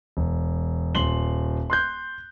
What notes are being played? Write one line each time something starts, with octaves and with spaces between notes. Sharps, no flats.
E1
D#1 C6 F#7 G7
C6 F#6 G6